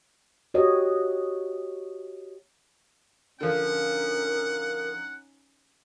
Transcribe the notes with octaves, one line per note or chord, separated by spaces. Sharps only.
F#4 G4 C#5 D#5
D3 F3 C#4 D#4 A#4 F#5